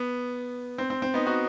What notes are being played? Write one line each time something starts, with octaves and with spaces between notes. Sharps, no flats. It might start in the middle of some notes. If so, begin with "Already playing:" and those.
Already playing: B3
C4
C4
C4
B3 D#4
D#4 F#4